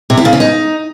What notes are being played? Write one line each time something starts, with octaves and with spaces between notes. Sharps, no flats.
C3
E4
C#3
C#4
D#4